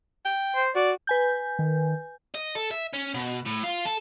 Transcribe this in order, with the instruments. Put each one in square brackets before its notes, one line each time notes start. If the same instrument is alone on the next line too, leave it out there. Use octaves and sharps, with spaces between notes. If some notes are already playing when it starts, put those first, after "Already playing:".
[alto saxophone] G5
[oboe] C5
[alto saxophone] F#4 [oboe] D5
[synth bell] B4 G#5 G6
[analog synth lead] D#3
[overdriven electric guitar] D#5
A4
E5
C#4
B2
A2
F4
A4